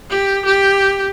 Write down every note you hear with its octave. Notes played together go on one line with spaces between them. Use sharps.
G4
G4